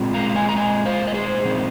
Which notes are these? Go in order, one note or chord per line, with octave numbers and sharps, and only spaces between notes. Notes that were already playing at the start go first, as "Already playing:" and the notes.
Already playing: A#2 G#3 C4 F4
F5 A#5
F5
D#5 G#5
A#5
D#5 G#5
C5 F5
D#5
G#4 C5
A#2 F3 C4 D#4